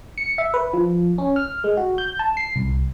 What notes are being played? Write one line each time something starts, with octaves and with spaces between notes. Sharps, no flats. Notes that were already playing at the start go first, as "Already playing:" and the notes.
C#7
E5
B4
F3
C#4
F6
G#3
F#4
G6
A5
C7
C2